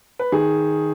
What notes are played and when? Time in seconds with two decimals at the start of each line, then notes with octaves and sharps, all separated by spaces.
0.19 B4
0.32 D#3 G#4